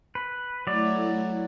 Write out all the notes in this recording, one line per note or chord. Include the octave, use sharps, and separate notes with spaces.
B4
F#3 A3 E4 D5